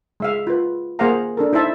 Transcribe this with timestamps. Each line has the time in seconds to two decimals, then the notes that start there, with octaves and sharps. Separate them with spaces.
0.20 G#3 E5 F5
0.47 F4 B4
0.99 A#3 G#4 C5 F5 F#5 A#5
1.37 D4 A4 A#4
1.53 D#4 E4 C5 E5 A5